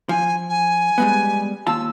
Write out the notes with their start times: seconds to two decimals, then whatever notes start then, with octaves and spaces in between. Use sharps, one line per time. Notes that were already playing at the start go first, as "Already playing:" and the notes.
0.09 F3 G#5
0.49 G#5
0.98 G3 G#3 B3
1.67 D#2 F4 A5 E6